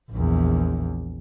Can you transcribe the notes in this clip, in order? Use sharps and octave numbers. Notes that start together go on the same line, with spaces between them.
A#1 E2